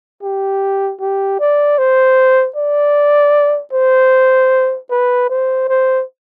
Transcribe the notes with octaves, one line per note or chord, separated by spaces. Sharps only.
G4
G4
D5
C5
D5
C5
B4
C5
C5